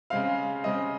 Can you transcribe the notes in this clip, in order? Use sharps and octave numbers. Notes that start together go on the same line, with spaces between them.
C#3 G#3 C4 F5
C#3 G#3 C4 D#5